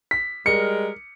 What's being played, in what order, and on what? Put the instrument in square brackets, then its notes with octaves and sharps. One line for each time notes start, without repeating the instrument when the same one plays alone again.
[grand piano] B6
[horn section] G3 G#3 A#4 [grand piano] C#7